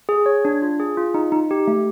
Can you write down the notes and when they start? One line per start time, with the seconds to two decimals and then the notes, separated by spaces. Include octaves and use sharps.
0.09 G#4
0.26 C#5
0.45 D4
0.62 F4
0.80 G#4
0.97 F4
1.14 D#4
1.32 D#4
1.51 G4
1.67 A3